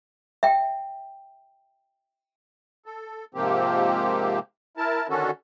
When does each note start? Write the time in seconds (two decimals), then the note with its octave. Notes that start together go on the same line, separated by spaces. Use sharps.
0.43 E5 G5
2.86 A4
3.35 G#2 C3 F3 A#3 C4 G4
4.77 E4 A#4 A5
5.09 D3 D#3 C#4 F#4 A4